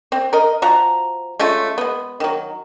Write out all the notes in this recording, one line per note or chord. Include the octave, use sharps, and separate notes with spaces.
C4
A#4 D#5
F3 F#4 A#5
G#3 A3 C#4 F4
G#3 B3
D#3 F#3